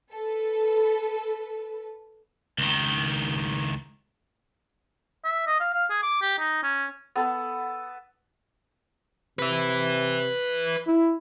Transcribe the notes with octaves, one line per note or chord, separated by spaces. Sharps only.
A4 B4
C#2 D#3
E5
D#5
F5
F5
G#4
D6
G4
D#4
C#4
B3 A4
C3 B4 E5
E4